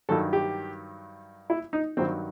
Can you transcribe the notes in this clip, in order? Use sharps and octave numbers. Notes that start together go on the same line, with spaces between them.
G2 D#3 F#3 A4
G4
E4
D#4
G2 D#3 F#3 C4